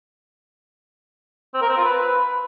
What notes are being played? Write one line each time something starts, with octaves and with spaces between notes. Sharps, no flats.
C4
A#4
C4
F4
B4